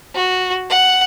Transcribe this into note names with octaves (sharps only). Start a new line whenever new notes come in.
F#4
F#5